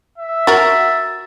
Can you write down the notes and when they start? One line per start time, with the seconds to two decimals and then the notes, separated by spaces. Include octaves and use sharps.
0.18 E5
0.47 F#4 A#4 A6